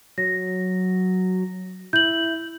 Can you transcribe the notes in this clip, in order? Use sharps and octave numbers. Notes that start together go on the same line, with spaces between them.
F#3 A#6
E4 G6 F#7